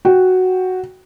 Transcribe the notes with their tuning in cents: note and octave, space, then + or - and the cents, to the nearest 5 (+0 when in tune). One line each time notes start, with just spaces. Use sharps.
F#4 +0 G5 +0